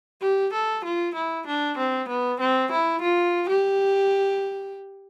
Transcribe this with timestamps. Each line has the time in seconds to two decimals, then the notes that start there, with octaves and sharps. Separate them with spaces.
0.21 G4
0.53 A4
0.85 F4
1.15 E4
1.47 D4
1.78 C4
2.09 B3
2.40 C4
2.72 E4
3.02 F4
3.49 G4